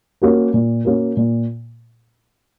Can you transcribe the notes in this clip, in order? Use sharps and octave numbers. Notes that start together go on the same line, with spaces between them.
A#3 C#4 F#4 A#4
A#2
A#3 C#4 F#4 A#4
A#2